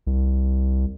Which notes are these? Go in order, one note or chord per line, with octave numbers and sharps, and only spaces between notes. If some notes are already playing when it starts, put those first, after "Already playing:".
C2